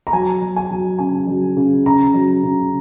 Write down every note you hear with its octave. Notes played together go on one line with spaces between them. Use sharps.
A#5
F#3 G#5
F#3
G#5
F#3
C#3 G#5
F#3
C#3
C#3 A#5
F#3
C#3